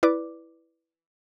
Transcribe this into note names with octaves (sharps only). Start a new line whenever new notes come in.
E4 B4 D5 D6